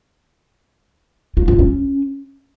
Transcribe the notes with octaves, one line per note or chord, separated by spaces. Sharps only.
F4
F4
C#4